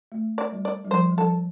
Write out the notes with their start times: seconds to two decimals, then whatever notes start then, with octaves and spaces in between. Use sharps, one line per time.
0.12 A3
0.38 D5
0.52 G3
0.65 D5
0.84 G3
0.90 F3 C5
1.09 G3
1.17 F3 A4